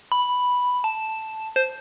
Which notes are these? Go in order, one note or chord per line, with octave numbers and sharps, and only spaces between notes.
B5
A5
C5